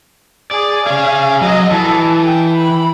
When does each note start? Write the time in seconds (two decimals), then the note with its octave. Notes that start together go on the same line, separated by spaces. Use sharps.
0.51 G#4 D5
0.86 G#4 C#5 F5
1.42 F#3 D#5
1.71 E3 A4
2.25 G5
2.56 B5